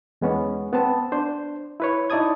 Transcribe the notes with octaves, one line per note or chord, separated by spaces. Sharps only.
E2 G#3 B3 C#4
B3 C4 A5
D4 C5
E4 B4 C#5
D#4 E4 D5 A5 D#6 G#6